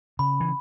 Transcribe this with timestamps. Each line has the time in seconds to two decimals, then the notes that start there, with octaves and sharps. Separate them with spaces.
0.19 C#3 B5
0.40 E3